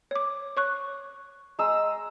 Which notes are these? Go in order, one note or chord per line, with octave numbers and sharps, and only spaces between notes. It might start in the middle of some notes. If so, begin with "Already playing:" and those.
C#5 D6
C#5 C#6 F#6
G#3 A#5 E6